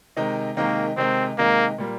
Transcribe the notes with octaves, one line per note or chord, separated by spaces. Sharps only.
C3 D#3 G#3 D#4
C3 D#3 G#3 A#3 D#4
C3 D#3 G#3 C4 D#4
C3 D#3 G#3 A#3 D#4
A#2 G3 A#3